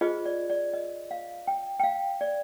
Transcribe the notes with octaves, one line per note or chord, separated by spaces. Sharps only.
F4 G#4 C5 D#5
D5
D5
D#5
F5
G5
G5
F5
D5